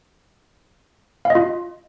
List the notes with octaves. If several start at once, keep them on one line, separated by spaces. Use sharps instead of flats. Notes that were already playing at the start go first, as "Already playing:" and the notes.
F5
D#5
F4